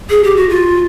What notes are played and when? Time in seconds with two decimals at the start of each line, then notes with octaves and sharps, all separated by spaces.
0.10 G#4
0.24 G4
0.36 F#4
0.49 F4